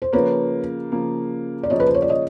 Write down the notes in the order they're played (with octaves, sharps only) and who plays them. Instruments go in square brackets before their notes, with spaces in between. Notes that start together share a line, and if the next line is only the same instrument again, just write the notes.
[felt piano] C5
[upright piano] C#3 F3 A#3 [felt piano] B4 C#5
[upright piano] C#3 F3 A#3
[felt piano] D5
[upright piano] C#3 F3 A#3 [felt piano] C#5 D#5
[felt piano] B4
C5
C#5
D5
C#5 D#5